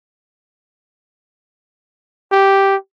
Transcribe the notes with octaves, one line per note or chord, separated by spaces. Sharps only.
G4